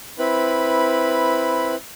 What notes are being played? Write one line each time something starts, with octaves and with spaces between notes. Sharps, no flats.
C4 E4 B4 B5